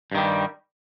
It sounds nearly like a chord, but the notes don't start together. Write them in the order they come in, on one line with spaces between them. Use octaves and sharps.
G2 D#3 G3